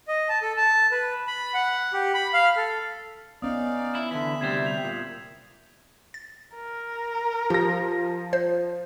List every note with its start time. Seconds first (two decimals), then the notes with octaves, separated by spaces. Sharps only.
0.08 D#5
0.29 A5
0.42 A4
0.57 A5
0.91 B4
1.27 B5
1.54 F#5
1.93 G4
2.14 B5
2.34 F5
2.56 A4
3.42 B3 C#4 D#4 D5 F5 D#6
3.95 E4 F#7
4.11 D3 E3 E5 B6
4.41 D2 C3 G3 G#6 C7 E7
4.65 G6 F7
4.84 A#2
6.14 A6
6.55 A#4
7.50 F3 G4 A#6
8.33 C5